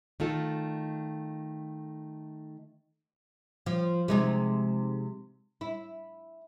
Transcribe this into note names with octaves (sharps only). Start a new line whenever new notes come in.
D#3 A3 F4 A4
F3
C3 G#3 D#4
E4